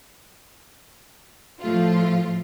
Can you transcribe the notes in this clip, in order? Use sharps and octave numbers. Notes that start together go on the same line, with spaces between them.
A2 F3 A3 F4